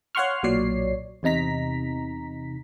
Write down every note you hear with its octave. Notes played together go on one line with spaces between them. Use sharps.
C#5 F5 F#5 C6 C#6 F6
B1 A#2 F#3 C#5 D5 C7
E2 C3 D#4 A#5 B6